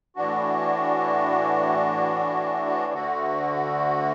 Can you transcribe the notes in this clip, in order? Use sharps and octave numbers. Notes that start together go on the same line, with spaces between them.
A2 E3 D4 F#4
D2 D3 A3 F#4